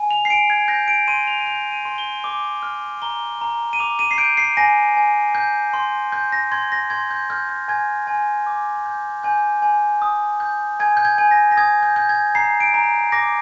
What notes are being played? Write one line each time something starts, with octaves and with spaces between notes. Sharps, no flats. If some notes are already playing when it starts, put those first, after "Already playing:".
Already playing: G#5
F7
C7
G#5 D7
G#6
G6 A#6
D7
C6 D#7
F7
D#7
G6 F7
D#7
C6
G7
D6
F6
A#5 G7
A#5
D#7
D6 F7
D#7
C7
G6 D7
C7
G#5 A#6
G#5
G6
C6
G6
A#6
C6 G#6
A#6
C6 G#6
G6
F6 G6
G6
G#5 G#6
G#5
D6
G6
G#5 G6
G#5
D#6
G6
G#5 G#6
G6
G#6
G#5
A#6
A#6
D#6 G#6
G6
G6
G#6
A#5 C7
D7
A#5
D6 A#6